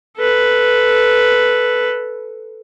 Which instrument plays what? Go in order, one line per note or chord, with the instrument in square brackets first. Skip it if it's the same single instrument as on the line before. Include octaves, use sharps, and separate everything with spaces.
[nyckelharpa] A4 B4